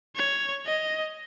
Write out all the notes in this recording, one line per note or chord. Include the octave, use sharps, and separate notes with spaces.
C#5
D#5